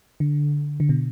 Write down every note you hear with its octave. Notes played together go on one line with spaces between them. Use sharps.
D3
D3
B2